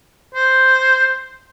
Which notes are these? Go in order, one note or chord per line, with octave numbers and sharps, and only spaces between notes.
C5